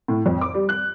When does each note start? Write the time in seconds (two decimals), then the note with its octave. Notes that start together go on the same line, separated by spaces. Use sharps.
0.08 A2
0.26 F2
0.41 D6
0.54 G3
0.69 F#6